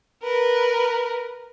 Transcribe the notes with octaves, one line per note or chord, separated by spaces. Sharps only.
A#4 B4